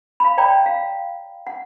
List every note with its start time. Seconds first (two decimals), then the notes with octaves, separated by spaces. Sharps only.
0.20 F5 B5
0.38 C#5 D5 G5 A#5 B5
0.66 F5
1.47 F#5